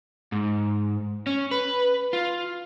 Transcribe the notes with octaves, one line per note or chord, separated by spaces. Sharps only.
G#2
C#4
B4
F4